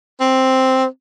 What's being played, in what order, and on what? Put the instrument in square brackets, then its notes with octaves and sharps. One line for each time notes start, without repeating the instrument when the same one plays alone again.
[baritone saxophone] C4